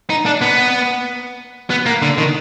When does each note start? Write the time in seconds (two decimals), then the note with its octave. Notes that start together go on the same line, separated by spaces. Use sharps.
0.10 D#4
0.26 D4
0.42 B3
1.70 B3
1.86 A#3
2.02 D3
2.18 D#3